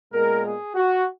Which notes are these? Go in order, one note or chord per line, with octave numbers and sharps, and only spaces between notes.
A#2 G#3 B3 A#4
G#4
F#4